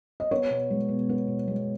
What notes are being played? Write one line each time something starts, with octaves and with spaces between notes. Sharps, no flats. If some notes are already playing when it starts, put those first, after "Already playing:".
D#5
B3 C#5
B2
G#3
B2
B3
B2
G#3